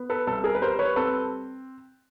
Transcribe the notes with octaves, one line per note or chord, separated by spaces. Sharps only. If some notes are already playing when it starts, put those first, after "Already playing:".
Already playing: B3
A4 B4
C2 A4
G#4 A#4
B4
G3 A#4 C5
B4 C#5
C4 A4 B4